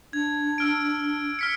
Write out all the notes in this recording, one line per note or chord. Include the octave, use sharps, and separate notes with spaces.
D4 G#6
E6 F6 D7
F6 B6 C#7